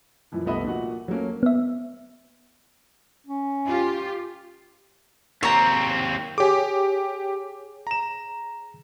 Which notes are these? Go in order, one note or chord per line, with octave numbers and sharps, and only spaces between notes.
F#2 A#2 E3 F3
C2 A3 B3 D#5 E5 B5
A#2 F3 F#4 F#5
F#3 A3 A#3 C#4
B3 E5
C#4
F4 G4
D#2 C4 C#5 A#5
G4 G#4 C#5 G#5 D6
A#5 E7